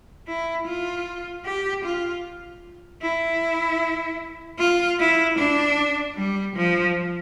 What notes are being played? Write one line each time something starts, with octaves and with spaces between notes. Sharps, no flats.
E4
F4
G4
F4
E4
F4
E4
D4
G3
F3